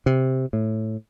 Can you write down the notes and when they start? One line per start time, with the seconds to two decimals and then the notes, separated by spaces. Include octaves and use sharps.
0.06 C3
0.53 A2